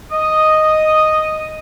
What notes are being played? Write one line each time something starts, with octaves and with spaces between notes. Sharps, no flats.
D#5 D#6